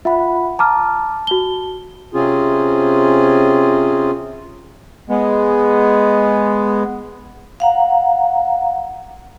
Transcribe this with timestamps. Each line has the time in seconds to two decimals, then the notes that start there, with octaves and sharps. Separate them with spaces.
0.05 F4 E5 F#5 B5
0.59 A5 A#5 D6 F6
1.27 F#4 G7
2.14 C3 C4 C#4 F4 G#4
5.09 G#3 B3
7.60 F5 F#5 A#5